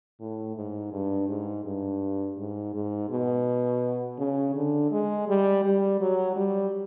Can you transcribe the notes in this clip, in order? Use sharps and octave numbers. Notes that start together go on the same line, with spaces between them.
A2
G#2
G2
G#2
G2
G#2
G#2
B2
C#3
D3
G#3
G3
G3
F#3
G3